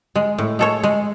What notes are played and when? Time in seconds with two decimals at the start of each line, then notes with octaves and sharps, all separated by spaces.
0.16 G#3
0.38 A2
0.59 G#3 A4 C#5
0.83 G#3